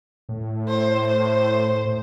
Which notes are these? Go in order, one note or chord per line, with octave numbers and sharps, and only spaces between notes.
A2
C5
C5
A2